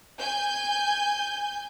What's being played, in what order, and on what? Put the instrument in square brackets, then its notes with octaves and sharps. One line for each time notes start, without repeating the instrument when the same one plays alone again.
[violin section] G#5 G6